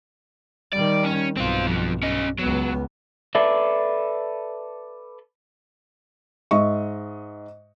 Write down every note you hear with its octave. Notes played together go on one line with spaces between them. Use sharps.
D#3 G3 D5
C#4
B1 G2 C4 F4
F2 F3
C#4 D#5
C#2 F#3 B3
A4 B4 D5 E5
G#2 D#5 E5 C#6